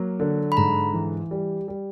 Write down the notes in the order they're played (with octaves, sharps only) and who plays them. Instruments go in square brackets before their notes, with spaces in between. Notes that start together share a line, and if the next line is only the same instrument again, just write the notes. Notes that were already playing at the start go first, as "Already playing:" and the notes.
Already playing: [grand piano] F#3 A#3
D3
[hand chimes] B5
[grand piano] G#2 [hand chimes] A#5
[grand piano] E3
G3
G3